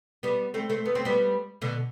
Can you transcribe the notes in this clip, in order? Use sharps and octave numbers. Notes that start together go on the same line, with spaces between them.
G3 B3
A3 C4
A3 C4
B3
C4
G3 B3
B2 D3